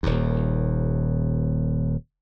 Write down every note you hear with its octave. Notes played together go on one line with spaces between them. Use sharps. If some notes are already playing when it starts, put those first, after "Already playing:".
D#1 D#2